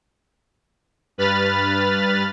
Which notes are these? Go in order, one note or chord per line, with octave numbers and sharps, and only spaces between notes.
G2 B4 B5 F6 A6